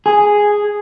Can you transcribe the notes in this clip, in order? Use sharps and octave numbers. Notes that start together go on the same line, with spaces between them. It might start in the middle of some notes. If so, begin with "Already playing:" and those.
G#4